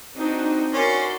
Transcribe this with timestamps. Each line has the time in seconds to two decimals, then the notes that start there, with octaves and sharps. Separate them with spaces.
0.16 C4 D4 D#4 F#4
0.74 C#4 F#4 A#4 D5 C6